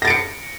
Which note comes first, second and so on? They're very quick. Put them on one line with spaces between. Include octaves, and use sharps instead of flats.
A#6 A6 D7 C#7